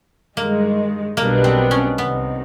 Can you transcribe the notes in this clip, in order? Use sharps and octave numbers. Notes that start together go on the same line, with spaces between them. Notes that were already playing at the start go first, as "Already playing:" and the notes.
G2 D#3 G#3 A#3
B1 B2 G3 A#3 B3 D4
C4
C#4
C2 C3 D#3 B3